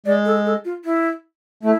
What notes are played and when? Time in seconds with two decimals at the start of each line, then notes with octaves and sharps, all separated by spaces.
0.05 G#3 D5
0.25 A4
0.45 A4
0.65 F4
0.85 E4
1.63 A3 E4